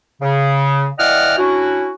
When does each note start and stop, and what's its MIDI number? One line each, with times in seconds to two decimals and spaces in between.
0.21 0.87 49
0.99 1.34 52
0.99 1.34 74
0.99 1.34 75
0.99 1.34 78
0.99 1.34 79
0.99 1.34 89
1.37 1.91 61
1.37 1.91 62
1.37 1.91 64
1.37 1.91 66